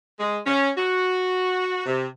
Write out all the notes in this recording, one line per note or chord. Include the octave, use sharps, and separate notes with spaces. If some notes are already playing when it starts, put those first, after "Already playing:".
G#3
C#4
F#4
C3